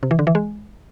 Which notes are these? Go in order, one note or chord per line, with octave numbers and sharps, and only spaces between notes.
C3
E3
D3
E3
G#3